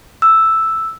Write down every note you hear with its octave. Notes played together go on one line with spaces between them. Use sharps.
E6